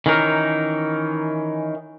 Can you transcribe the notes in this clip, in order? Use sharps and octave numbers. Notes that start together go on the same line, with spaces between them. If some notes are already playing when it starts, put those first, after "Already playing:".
D#3 E3 C#4 D#4 A#4